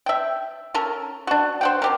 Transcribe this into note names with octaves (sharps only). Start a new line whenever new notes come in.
E5 G5
C#4 A4 A#4
D4 F#4
C5 F#5 G5
C4 G4 A#4